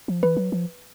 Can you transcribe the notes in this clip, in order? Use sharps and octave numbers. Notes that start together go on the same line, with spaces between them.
F3
E3 B4
F#3
F3